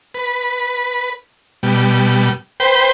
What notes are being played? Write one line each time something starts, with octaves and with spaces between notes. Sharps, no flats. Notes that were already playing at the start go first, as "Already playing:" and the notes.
B4
B2 G3
B4 C5 G5